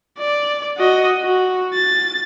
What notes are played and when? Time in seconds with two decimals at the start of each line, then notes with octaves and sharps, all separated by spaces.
0.18 D5
0.78 F#4 D#5
1.23 F#4
1.74 A6